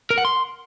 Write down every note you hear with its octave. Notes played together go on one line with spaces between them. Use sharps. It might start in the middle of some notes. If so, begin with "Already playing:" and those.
A#4
F#5
C6